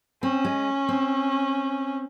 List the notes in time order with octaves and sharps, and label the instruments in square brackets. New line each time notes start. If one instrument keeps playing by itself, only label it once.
[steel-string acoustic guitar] C4 [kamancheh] C#4
[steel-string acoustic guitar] G#3
C4